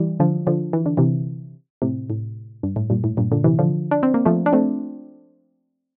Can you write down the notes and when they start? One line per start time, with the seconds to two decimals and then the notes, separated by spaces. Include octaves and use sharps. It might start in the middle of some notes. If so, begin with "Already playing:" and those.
Already playing: E3 G3
0.20 D3 F3
0.47 D3 F3
0.73 E3
0.86 D3
0.97 C3 E3
1.82 A2 C3
2.10 A2
2.63 G2
2.76 A2
2.90 G2 A#2
3.04 A2
3.17 G2 A#2
3.32 A#2 D3
3.44 C3 E3
3.59 D3 F3
3.91 D4
4.03 C4
4.14 A#3
4.25 F3 A3
4.46 D4
4.53 A3 C4